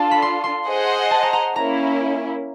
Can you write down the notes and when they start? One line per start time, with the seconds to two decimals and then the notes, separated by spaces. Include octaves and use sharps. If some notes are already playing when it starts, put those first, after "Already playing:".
Already playing: D4 F4 A4 A5
0.11 B5
0.22 C6
0.44 C6
0.66 G#4 C5 D#5 F#5
1.11 A5
1.23 A#5
1.33 A#5
1.55 A#3 C#4 E4 A#5